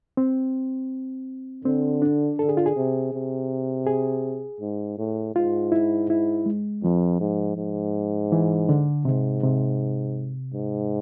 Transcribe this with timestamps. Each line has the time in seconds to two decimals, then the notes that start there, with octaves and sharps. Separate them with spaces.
0.17 C4
1.64 D3 C4
2.02 D4
2.39 D3 A4
2.49 G#4
2.57 F4
2.66 G#4
2.76 C3
3.13 C3
3.87 G#4
4.61 G#2
4.98 A2
5.35 G#2 F4
5.72 E4
6.10 E4
6.46 G#3
6.83 F2 F3
7.21 G#2
7.57 G#2
8.32 E3
8.69 D3
9.05 G#2 C3
9.43 C3
10.54 G#2